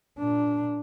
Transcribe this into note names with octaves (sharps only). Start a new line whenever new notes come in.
A#2 D4